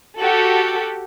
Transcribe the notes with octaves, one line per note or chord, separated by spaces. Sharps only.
F#4 G4 A4